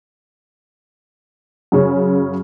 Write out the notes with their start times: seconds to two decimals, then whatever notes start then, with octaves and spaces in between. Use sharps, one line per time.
1.72 F#2 C#3 C#4